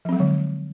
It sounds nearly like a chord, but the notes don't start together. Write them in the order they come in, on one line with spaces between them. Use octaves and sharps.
F3 C4 F#3 G#3 D3